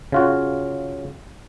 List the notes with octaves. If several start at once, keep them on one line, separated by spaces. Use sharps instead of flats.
C#3 F4 F#4